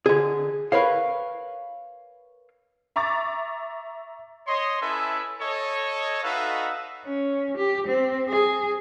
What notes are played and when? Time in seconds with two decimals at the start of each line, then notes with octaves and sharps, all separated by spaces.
0.06 D3 G#4
0.72 A#4 B4 C#5 F5
2.96 E5 A#5 C#6 D6 A6
4.47 C#5 D#5 C6
4.81 C#4 E4 A4 B4 E5 G#5
5.40 A4 C#5 D#5
6.23 D#4 F#4 A4 B4 E5 F5
7.06 C#4
7.57 G4
7.87 C4
8.28 G#4